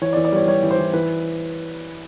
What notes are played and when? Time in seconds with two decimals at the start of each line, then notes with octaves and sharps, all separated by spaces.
0.02 E3 C#5
0.13 D5
0.17 E3
0.25 D5
0.32 G3 C#5
0.48 G3 C#5
0.63 E3
0.71 C5
0.78 E3
0.94 E3 B4